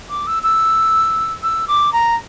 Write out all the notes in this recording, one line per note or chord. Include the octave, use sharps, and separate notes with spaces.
D6
E6
E6
E6
D6
A#5